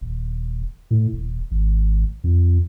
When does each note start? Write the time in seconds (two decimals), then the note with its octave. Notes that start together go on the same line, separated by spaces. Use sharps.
0.01 D#1
0.91 A2
1.13 D#1
1.51 G#1
2.24 F2